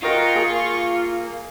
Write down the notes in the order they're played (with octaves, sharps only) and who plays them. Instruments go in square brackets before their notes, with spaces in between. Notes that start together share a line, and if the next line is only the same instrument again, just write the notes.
[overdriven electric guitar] F4 [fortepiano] F#4 A#4 D#5 [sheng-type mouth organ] G5 A#5 [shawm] C#6
[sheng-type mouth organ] A#3 [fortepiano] G#4 C6